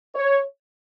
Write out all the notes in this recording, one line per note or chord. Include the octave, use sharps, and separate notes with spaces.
C#5